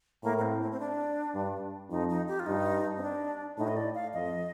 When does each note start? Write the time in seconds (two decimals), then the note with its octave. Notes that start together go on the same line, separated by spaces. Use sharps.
0.23 A2 A#3
0.38 A#3
0.42 C4
0.61 C4
0.72 C4
0.80 D4
1.34 G2
1.90 F2 D#4
2.09 D#4
2.28 G4
2.39 F4
2.46 G2 D#4
2.97 C4
3.03 D4
3.58 A2 D#4
3.68 D#5
3.76 D5
3.95 F5
4.14 F2 D#5